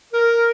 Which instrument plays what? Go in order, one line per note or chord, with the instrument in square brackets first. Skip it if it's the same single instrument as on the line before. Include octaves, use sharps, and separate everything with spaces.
[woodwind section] A#4